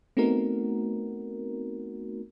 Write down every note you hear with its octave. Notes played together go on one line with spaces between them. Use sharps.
A3 B3 C4 D#4 F#4 A#4